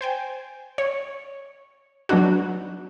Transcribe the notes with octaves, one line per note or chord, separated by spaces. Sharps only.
C5 G5 G#5
C#5
F#3 B3 D4 D#4 F#4